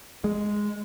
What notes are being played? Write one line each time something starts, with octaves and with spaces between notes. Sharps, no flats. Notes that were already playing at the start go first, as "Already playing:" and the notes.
G#3